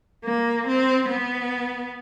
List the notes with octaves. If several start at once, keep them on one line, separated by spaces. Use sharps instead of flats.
A#3
C4
B3